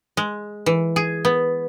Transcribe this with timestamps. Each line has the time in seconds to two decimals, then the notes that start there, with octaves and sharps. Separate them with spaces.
0.17 G#3
0.66 E3
0.96 G#4
1.25 B3